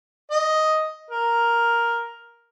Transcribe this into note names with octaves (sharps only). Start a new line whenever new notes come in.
D#5
A#4